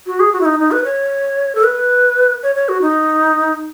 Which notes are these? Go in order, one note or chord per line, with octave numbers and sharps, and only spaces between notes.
F#4
G#4
F#4
E4
D#4
D#4
B4
C#5
A4
B4
C#5
C#5
F#4
D#4